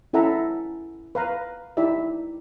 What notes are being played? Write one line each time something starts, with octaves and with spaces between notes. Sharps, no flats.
C#4 E4 A4 E5 F#5 A#5
B4 F5 A#5
D#4 E4 G4 D5 E5